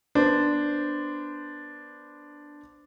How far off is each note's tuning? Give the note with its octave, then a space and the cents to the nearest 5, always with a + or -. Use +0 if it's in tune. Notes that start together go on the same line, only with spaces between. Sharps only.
B3 -20 D4 +0 C5 -15